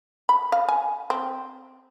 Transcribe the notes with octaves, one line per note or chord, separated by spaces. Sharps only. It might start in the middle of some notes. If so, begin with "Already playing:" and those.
B5
F5
G#5
C4